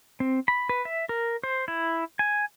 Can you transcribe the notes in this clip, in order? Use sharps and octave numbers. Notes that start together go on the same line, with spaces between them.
C4
B5
B4
E5
A#4
C5
E4
G#5